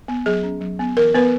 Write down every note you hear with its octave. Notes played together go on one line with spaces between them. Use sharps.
B3
F#3 G#4
C#4
F#3
B3
E3 A#4
B3 B4